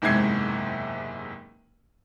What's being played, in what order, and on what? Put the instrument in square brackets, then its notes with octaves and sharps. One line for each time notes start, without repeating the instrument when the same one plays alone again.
[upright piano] F#1 E2 G#2 C3 G#6 C7